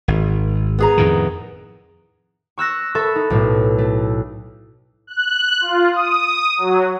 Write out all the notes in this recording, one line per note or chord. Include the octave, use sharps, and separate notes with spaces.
G#1
B3 G#4 A#5
F2 A2 D#3
C#6 E6 F#6 A#6
A4 E5 B5 C#6
D#4
B1 A2
A3
F#6
F4
D#6
F#3